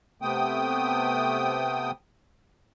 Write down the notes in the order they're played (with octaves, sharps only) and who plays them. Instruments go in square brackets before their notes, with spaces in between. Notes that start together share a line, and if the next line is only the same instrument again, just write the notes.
[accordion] C3 A3 B3 G5 D#6